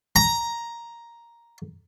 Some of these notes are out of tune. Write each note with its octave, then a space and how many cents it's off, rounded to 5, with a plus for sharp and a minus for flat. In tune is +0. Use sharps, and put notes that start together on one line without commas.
A#5 +5